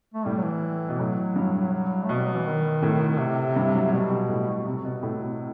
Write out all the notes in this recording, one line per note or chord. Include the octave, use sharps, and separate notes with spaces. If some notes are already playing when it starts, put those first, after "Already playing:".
A3
A2 G3
F#3
E3
B2
A2 F#3
G2
F#3
B2 A3
G3
F#3
E3
D#3
A2
C3
G2
F#3
B2 G3
G3
A2
C3
B2
A2
B2